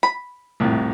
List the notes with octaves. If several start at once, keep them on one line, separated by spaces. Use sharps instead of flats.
B5
C2 F2 A2